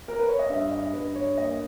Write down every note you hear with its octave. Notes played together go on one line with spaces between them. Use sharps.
A#4
B4
C#5
D#5
G2 E5
D#5
G2 B4
C#5
A#3 D#5